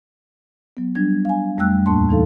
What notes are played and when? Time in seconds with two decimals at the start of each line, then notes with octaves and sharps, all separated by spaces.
0.77 F#3 B3
0.95 F#3 G3 D4 G#6
1.25 F5 G#5
1.58 F2 G3 A3 G5 E6 F#6
1.86 D#2 A2 A#3 D4 A5 C6
2.09 E3 D#4 A4 F5